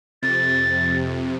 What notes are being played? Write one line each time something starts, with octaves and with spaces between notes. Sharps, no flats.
F2 C3 A6